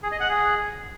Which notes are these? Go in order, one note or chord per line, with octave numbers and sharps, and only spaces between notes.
G#4
D#5
F#5
G#4